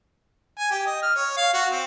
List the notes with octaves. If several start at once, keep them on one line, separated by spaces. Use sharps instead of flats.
G#5
G4
D#5
F6
C#5
F5
F#4
C4